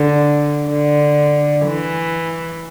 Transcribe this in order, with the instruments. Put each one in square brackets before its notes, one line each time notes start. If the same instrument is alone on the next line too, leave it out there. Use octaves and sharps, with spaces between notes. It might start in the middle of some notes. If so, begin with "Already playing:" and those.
Already playing: [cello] D3
D3
E3